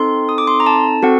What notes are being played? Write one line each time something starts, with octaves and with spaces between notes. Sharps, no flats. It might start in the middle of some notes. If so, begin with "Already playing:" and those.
Already playing: C4 D#4 A4 C6
D#6
D6
C6
A#5
A5
C4 F#4 A4 F#5